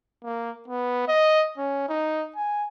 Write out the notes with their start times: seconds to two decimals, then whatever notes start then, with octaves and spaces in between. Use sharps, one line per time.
0.24 A#3
0.68 B3
1.08 D#5
1.58 C#4
1.89 D#4
2.36 G#5